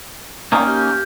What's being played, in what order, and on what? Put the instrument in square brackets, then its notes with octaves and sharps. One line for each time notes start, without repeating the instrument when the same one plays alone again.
[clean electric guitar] A#3 C#4 D#4 [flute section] D5 G5
[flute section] G4 F6 G6